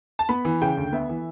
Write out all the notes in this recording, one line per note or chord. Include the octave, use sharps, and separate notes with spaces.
A5
B3 B5
E3
C#3 G5
D2
B3 E5
E3